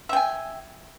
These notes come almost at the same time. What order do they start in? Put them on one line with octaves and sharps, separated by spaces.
E5 G5 G#5